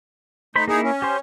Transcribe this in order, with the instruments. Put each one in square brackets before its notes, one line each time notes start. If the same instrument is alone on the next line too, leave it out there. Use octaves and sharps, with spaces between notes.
[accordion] A3 D#4 [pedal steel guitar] C5 B5
[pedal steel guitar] A#3 E4 [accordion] D#4 G#4
[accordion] C#4
[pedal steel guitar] G4 C5